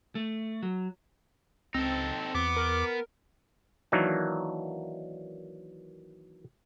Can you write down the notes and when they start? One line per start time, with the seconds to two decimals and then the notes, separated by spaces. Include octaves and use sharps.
0.15 A3
0.63 F#3
1.74 C#2 C4 D#4 A4
2.35 E2 B3 D6
2.56 A#4
3.92 D#3 E3 F#3 A#3 D4 D#4